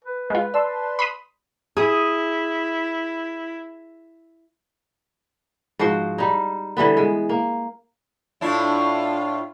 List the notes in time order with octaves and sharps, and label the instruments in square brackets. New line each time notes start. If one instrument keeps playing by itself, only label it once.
[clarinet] B4
[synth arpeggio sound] G#3 F4 [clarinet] B4
[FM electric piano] D5 A5 C6 [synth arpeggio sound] E6
[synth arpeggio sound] B5 C6 D#6
[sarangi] E4 [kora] G#4 [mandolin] D#6
[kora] G#2 F3 F#4 C5
G3 D#4
D3 E3 G3 B3
G#3
A#3
[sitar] A2 D4 E4 [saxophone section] F4